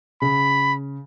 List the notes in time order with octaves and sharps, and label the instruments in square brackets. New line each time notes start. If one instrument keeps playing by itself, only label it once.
[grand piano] C#3 [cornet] B5